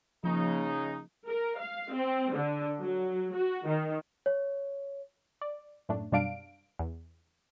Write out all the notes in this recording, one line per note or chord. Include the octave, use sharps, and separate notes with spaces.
C#3 F3 A#3 D#4
A#4
F5
C4
D3
F#3
F#4
D#3
C#5
D5
F#2 A2 A3 D4
F#2 B2 G3 D4 F5 D7
E2